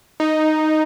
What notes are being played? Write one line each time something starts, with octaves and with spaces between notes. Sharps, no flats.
D#4